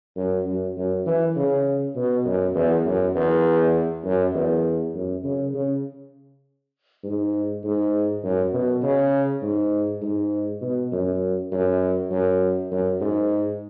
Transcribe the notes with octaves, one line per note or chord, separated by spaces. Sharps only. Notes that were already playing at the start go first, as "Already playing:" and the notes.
F#2
F#2
F#2
E3
C#3
B2
F#2
E2
F#2
E2
F#2
E2
F#2
C#3
C#3
G#2
G#2
F#2
B2
C#3
G#2
G#2
B2
F#2
F#2
F#2
F#2
G#2